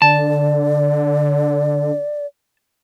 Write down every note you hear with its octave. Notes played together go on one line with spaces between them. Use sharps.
D3 D5 A5